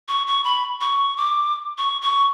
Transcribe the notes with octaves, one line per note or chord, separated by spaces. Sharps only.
C#6
C#6
B5
C#6
D6
C#6
C#6